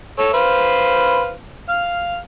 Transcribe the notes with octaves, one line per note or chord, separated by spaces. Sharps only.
A4 C#5
B4 C5 F5
F5 F6